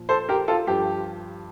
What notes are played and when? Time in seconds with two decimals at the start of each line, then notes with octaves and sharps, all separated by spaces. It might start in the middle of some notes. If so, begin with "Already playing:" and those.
Already playing: A#2 F3
0.09 A4 C5
0.29 G4 A#4
0.48 F4 A4
0.67 G2 F3 G4